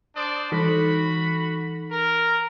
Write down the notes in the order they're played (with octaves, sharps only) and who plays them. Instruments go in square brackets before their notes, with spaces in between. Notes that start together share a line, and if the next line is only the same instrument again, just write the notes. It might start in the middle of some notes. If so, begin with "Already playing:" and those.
[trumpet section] D4 C5 D5 [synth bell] D#6
[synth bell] E3 D#4 A4 [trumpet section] F#4 B5
[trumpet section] A#4